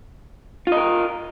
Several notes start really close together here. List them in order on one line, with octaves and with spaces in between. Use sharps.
F4 D#5 A#4